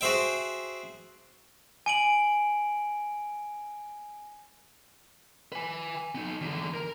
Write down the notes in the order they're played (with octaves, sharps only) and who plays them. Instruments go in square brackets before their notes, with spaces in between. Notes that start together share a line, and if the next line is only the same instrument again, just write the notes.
[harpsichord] F#4 G#4 C5 E5 G5
[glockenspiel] G#5 D7 F#7
[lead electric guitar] B4 G#5
B3 D#4
E2 D3
A#4